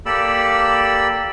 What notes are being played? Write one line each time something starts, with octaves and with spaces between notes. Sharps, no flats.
A#3 G4 A4 D5 B5 E6